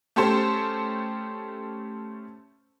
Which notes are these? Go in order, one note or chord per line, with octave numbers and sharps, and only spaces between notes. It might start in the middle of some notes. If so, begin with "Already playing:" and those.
A3 C#4 G4 A4 C5